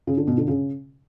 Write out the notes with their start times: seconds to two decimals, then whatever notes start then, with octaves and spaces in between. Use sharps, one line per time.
0.07 C#3
0.17 D3
0.27 B2
0.38 D3
0.48 C#3